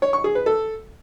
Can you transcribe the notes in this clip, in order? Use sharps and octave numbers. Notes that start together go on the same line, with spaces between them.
C#5
C#6
G#4
B4
A4